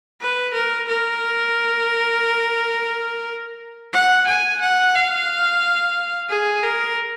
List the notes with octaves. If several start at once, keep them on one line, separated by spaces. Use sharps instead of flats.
B4
A#4
A#4
F#5
G#5
F#5
F5
G#4
A#4